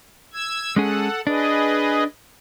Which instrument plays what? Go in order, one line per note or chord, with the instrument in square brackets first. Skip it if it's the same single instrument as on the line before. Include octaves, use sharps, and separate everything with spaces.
[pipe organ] E6 G#6
[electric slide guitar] G#3 C#4 G#4 [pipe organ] A4 F#5
[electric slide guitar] D4 [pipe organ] G#4 B4 D#5